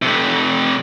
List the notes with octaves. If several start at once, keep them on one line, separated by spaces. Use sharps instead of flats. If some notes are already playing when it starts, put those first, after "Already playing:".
F2 C3